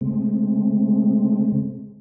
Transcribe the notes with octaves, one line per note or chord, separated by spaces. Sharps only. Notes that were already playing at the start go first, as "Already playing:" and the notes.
C#3 G#3 A3 C4